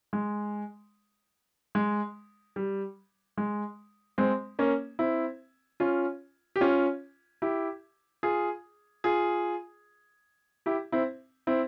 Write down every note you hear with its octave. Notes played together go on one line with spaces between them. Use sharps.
G#3
G#3
G3
G#3
G#3 C4
A#3 C#4
C4 E4
C#4 F4
G4
C#4 F4
E4 G4
F4 G#4
F4 G#4
E4 G4
C4 E4
C4 E4